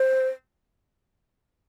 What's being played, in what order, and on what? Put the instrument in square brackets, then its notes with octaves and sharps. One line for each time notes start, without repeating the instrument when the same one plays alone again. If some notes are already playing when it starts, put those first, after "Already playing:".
Already playing: [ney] C5